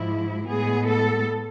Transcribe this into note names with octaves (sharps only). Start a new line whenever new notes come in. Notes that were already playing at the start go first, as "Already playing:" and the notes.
Already playing: G#2 F3 G#3 E4
A2 G#3 B3 G#4
A4